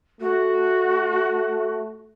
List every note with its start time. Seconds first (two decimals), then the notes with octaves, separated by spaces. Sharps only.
0.21 A3 F#4